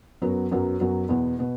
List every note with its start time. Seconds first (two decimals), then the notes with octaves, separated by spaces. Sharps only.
0.22 F#2 F#3 B3 F#4
0.51 F#2 F#3 B3 F#4
0.80 F#2 F#3 B3 F#4
1.09 E2 B2 B3
1.39 B2 B3